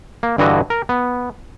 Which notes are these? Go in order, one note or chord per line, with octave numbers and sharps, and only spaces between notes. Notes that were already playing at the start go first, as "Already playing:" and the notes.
A#3
G2 D3 E3 F#4 D#5
A#4
B3